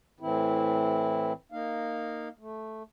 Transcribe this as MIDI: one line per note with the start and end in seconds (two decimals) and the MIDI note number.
0.20 1.33 45
0.20 1.33 52
0.20 1.33 60
0.20 1.33 64
1.52 2.29 58
1.52 2.29 63
1.52 2.29 77
2.39 2.83 57